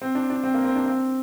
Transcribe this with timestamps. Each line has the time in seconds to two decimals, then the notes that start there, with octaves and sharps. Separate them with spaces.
0.02 C4
0.15 D4
0.30 D4
0.44 C4
0.54 A#3
0.65 C4
0.76 D4
0.86 C4